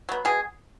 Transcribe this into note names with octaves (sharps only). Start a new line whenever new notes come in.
F#3 B3
B2 G#4